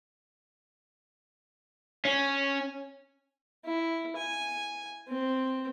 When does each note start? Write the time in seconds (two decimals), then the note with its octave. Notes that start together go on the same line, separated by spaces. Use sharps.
2.05 C#4
3.65 E4
4.16 G#5
5.08 C4